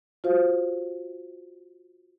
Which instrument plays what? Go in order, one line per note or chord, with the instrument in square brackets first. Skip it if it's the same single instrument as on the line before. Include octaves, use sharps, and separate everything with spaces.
[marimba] F4 F#4 C5 F5